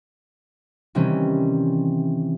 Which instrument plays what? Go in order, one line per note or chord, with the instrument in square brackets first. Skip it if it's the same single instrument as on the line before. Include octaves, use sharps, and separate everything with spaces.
[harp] C3 D#3 E3 G3 C4 C#4